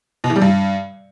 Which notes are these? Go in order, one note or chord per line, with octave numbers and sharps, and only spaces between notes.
B2
E3
G3
G2